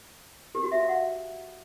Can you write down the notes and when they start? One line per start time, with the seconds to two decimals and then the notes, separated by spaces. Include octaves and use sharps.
0.55 G4
0.63 F#4
0.72 E5
0.80 F5
0.89 F#5